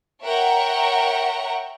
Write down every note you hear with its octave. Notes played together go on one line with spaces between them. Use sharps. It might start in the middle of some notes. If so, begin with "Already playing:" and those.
A#4 C#5 E5 F#5 G5 A#5